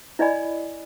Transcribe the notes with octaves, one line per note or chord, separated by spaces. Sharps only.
E4 D5 D#5 G#5 B5